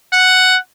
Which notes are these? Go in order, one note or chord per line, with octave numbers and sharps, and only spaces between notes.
F#5